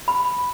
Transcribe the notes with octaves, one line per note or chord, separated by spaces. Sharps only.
B5